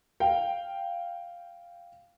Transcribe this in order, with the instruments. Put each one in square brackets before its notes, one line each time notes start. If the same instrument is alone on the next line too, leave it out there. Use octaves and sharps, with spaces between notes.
[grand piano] F5 G5